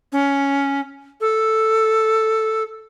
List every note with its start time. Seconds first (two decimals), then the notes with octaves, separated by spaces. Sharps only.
0.12 C#4
1.21 A4